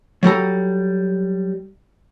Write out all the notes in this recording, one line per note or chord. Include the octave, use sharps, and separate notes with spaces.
F#3 G3 A4 A#5